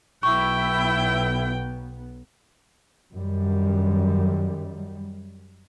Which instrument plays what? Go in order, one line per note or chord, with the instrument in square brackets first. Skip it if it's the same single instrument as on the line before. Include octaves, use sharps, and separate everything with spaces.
[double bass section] B1 B3 [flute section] E4 [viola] G5 [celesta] C#6
[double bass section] F#2 D#3 G3